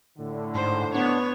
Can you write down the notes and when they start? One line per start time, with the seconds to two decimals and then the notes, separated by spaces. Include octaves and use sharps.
0.18 A2 D3
0.55 G#2 C5
0.94 B3 D4 C#5